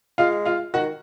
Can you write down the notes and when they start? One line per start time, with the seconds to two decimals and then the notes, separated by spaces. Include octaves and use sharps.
0.18 G#3 F4 F5
0.45 F4 F5
0.74 D#3 F#4 F#5